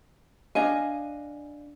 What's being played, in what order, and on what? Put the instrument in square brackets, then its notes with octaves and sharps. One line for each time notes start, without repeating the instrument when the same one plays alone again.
[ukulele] D4 D#5 F5 G#5